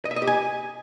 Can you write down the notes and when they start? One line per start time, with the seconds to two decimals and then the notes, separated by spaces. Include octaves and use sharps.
0.05 D#5
0.11 E5
0.16 D#5
0.22 G4
0.27 G#5